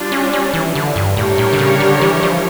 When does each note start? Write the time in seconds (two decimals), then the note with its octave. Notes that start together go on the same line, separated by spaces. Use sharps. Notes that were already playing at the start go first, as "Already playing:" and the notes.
Already playing: G3 D4 F4
0.12 C#4
0.33 C#4
0.54 E3
0.75 D3
0.96 G2
1.17 A2 G3 D4 G4 A#4 C#5
1.38 A2
1.53 D3
1.59 C#3
1.80 D3
2.01 E3
2.23 F3